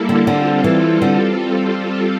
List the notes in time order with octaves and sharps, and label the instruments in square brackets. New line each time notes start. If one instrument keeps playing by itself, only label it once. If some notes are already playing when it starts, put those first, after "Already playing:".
Already playing: [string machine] G3 A#3 E4 A4
[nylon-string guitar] D3
[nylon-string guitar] D3 [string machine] G3 C4 F4 A4
[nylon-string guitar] E3
D3